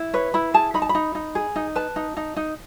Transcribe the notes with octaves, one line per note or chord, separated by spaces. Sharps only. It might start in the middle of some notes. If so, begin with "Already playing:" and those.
Already playing: E4
B4 C#5
E4 B5
G#4 A5
D#4 B5
A5
B5
D#4
D#4
G#4
D#4
B4 A5
D#4
D#4
D#4